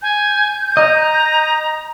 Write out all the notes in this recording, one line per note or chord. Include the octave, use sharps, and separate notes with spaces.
G#5 G6
D#5 A#5